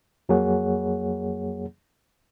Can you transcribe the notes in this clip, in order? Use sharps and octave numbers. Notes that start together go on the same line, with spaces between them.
F2 F#3 A#3 G#4 C#5 F#5